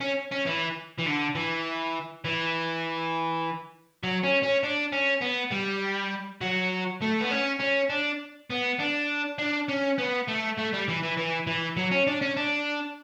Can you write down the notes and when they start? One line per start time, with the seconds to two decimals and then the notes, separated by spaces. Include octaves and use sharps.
0.01 C#4
0.32 C#4
0.46 E3
0.98 E3
1.06 D3
1.35 E3
2.24 E3
4.04 F#3
4.24 C#4
4.43 C#4
4.63 D4
4.93 C#4
5.22 B3
5.52 G3
6.41 F#3
7.01 A3
7.21 B3
7.31 C#4
7.60 C#4
7.90 D4
8.50 B3
8.80 D4
9.38 D4
9.68 C#4
9.98 B3
10.28 A3
10.58 A3
10.73 G3
10.88 E3
11.03 E3
11.17 E3
11.47 E3
11.77 F#3
11.91 C#4
12.07 D4
12.22 C#4
12.37 D4